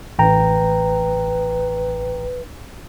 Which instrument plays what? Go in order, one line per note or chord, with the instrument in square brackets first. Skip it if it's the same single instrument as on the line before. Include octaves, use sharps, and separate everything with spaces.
[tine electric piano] A1 G5 A#5 [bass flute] B4